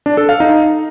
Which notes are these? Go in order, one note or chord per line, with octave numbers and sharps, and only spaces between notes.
D4
A4
F5
D#4